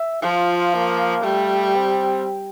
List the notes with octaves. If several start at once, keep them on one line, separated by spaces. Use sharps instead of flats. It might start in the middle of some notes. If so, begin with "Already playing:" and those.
Already playing: E5
F3 F4
A#3
G3 A3
C4